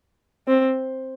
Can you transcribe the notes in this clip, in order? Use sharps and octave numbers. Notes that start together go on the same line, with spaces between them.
C4